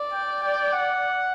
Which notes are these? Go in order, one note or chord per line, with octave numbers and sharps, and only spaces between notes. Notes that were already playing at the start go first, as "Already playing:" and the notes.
Already playing: D5
G5
G5
F#5